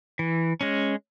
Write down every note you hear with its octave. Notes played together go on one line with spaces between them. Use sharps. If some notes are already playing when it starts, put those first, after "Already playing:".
E3
G#3 C#4